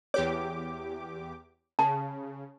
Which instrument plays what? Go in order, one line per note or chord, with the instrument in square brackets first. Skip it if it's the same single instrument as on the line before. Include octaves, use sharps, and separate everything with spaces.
[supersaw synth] E2 G4 D6 [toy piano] C#5
[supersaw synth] C#3 [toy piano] A5